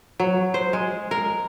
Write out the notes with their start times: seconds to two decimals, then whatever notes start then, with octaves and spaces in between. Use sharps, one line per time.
0.20 F#3
0.54 C5
0.73 G#3
1.11 A#4